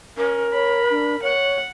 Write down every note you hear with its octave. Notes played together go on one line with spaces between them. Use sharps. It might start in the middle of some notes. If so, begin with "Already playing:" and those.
C#4 A#4
C#5 B5
D4
C#5 F#5